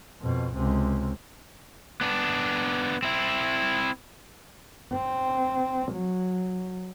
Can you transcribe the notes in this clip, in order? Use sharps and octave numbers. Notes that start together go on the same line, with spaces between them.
F2 B2
C#2 C3
B3 D4
C4 E4
C4
F#3